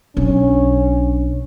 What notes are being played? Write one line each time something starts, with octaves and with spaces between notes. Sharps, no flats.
B1 C#4 D4